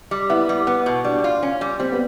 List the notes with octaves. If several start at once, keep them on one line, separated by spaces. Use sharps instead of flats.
G3
B3 E4
G3
B3
B2
G3 D4
F4
C#4
G3
G3 C4
B3